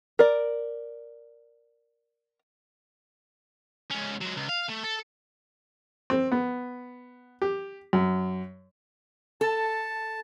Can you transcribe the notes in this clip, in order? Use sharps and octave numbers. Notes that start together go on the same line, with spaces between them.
A#4 D5
G#2 C#4
F#3 G#3
C#2
F5
A3
A4
C4
B3
G4
F#2
A4 A5